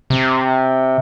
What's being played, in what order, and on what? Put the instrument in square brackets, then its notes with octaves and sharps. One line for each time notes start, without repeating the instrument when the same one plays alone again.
[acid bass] C3